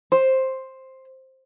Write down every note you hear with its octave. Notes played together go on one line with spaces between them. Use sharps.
C5